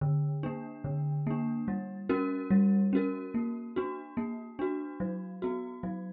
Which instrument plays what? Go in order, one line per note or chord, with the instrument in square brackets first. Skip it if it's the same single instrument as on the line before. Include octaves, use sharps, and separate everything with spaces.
[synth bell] D3
A#3 D4
D3
A#3 D4
G3
C#4 F#4 A#4
G3
C#4 F#4 A#4
A#3
D4 F#4
A#3
D4 F#4
F#3
B3 F#4
F#3